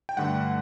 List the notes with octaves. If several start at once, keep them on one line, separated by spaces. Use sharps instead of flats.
G5
G2 D3 A3 F#5